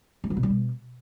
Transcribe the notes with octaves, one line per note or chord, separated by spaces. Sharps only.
G3
F#3
B2
G3
B2